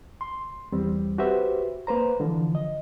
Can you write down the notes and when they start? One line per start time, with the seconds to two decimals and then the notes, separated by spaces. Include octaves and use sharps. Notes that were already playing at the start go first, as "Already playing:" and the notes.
0.21 C6
0.72 E2 G3 C4
1.18 F#4 G4 B4 C5 E5
1.87 A#3 B4 C5 A#5
2.20 D3 E3 F3
2.55 D#5